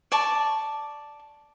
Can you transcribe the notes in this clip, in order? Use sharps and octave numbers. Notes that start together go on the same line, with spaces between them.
D5 A5 C#6